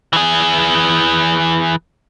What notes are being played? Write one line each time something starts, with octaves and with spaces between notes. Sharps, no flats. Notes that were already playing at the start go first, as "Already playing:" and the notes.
E3 G#4